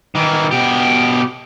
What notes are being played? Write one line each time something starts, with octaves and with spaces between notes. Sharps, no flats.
D#3 E3
B2 G4